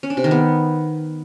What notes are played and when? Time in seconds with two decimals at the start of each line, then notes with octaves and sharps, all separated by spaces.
0.03 C#4
0.10 D4
0.17 C3
0.24 D#3
0.31 B3